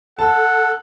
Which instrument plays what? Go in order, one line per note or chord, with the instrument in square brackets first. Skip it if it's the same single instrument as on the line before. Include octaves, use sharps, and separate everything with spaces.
[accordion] A4 [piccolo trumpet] F#5 [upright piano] A5